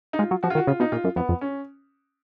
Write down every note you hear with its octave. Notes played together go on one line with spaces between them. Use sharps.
D#4
G#3 F4
F#3
F3 F#4
F4
D#3 F#4
C#3 F4
B2 D#4
A#2 F4
F#2
F2 B3
F2
C#4